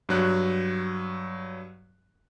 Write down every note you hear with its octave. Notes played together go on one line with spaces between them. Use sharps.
G2 F#3 F#6